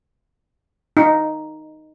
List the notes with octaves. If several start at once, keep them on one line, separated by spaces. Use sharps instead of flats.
D#4